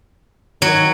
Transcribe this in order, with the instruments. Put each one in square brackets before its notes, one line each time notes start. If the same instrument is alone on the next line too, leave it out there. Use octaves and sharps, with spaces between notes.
[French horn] D#3 [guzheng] F#3